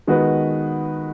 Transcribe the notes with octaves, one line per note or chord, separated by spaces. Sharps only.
D#3 G#3 B3 F#4 B4